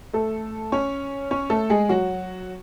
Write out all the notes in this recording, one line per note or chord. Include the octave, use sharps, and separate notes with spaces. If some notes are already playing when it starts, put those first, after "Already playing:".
A3 A4
C#4 C#5
C#4 C#5
A3 A4
G#3 G#4
F#3 F#4